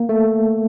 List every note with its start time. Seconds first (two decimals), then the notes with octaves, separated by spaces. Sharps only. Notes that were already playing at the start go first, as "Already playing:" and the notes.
Already playing: A#3
0.09 A3